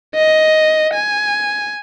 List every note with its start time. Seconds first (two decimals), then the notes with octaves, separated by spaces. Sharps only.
0.15 D#5
0.94 G#5